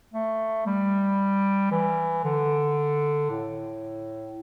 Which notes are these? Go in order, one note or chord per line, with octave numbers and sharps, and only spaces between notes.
A3
G3
E3
D3
A2